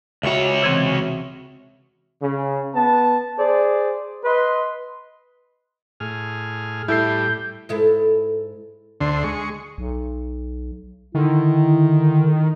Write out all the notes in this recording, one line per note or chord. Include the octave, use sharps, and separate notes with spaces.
C#2 F#4 C#5 E5
C3 E3 C4
C#3
B3 A5
G#4 C5 D5
B4 D#5 C6
A2 G#4 F6
A2 G3 E4 A4 G6 C7
G#2 E4 A4
D2 D3 C6
G#3 C#6
B1
D3 D#3 E4